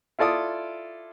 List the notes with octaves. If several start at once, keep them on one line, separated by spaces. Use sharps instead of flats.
E4 F4 A4 D5 D#6